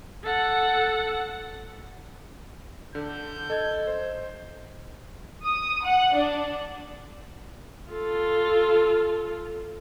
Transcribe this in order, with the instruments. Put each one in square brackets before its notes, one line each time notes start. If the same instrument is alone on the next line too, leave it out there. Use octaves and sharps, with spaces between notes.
[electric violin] A4 F#5
[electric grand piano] D3 [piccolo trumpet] G6
[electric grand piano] A4 G#6 [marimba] D#5
[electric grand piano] C5
[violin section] D#6
F#5
D4
[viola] F4 A4